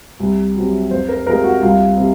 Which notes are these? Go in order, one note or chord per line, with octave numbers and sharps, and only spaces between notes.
C2
C3 F#3
F2 C5
A#4
C3 F3 G#3 A#4
F#4
C2 F4
C3